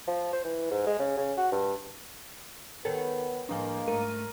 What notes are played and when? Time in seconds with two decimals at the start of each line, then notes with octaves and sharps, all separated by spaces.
0.07 F3
0.33 C5
0.44 E3
0.71 G#2
0.87 G#3
0.99 C#3
1.17 C#3
1.37 F#4
1.52 G2
2.85 D#3 B3 A4 A#4 C#5 G5
3.49 A2 F3 G#3 A#3 D4 D#5 G#5
3.88 G#2 A3 A#4 D#7